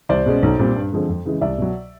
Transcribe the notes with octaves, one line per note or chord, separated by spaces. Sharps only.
C2 C5 D5
B2 G#3 C#4
B1
A#2 G3 C4
G2
D3 F3 G#3 C4
F2
C#3 E3 G#3
C2 D5 E5
B2 F#3